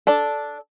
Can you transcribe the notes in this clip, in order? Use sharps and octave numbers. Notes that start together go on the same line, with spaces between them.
D4 A4 D5